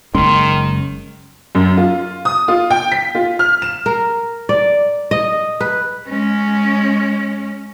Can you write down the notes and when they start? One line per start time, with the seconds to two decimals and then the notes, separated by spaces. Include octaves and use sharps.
0.15 F#1 D#3 G#3 C#4 C6
1.55 F#2
1.77 F4
2.25 D#6
2.48 F4
2.70 G5
2.92 B6
3.15 F4
3.39 F6
3.62 E7
3.86 A#4
4.49 D5
5.11 D#5
5.61 B4
6.09 G#3 C#4